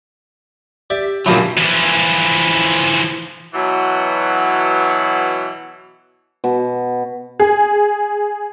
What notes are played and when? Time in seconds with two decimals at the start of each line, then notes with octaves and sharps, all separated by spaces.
0.90 G4 D5 E5
1.26 A#2 F3 F#3 E4 G4 A#4
1.57 E3 F3
3.54 B2 E3 F#3
6.44 B2
7.40 G#4